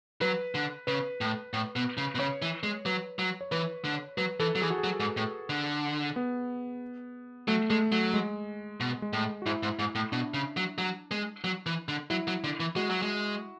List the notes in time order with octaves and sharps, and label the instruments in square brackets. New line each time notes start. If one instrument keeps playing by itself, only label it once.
[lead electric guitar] F#3 [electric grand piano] B4
[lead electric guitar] D3
[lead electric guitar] C#3 [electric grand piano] B4
[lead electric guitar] A2
A2
B2
C#3
B2
[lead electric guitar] C#3 [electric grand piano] C#5
[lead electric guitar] E3
G#3
[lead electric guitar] F#3 [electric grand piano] B4
[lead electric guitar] F#3
[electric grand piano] C#5
[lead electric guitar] E3 [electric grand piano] B4
[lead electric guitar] D3
[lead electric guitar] F#3 [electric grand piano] B4
[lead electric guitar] E3 [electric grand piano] A4
[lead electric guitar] F#3
[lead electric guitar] E3 [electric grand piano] G#4
[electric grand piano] F#4
G#4
[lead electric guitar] F#3
G#2
A2
D3
[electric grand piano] B3
[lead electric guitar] F#3 [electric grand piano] A3
[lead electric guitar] G#3 [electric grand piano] A3
[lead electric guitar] F#3 [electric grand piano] A3
[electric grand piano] G#3
[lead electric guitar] B2
[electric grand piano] G#3
[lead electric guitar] A2
[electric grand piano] F#4
[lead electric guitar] G#2 [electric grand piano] E4
[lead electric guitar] G#2
G#2
A2
[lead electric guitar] B2 [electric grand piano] D4
[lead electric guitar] C#3
F#3
F#3
G#3
F#3
E3
D3
[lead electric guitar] F#3 [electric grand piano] E4
[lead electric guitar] F#3
D3
E3
[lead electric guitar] G#3 [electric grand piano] F#4
[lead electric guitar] F#3
G#3